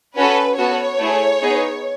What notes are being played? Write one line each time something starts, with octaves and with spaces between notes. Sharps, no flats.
C#4 F#4 A4 B4
B3 F#4 A4 C#5
A3 E4 G#4
B3 D#4 G#4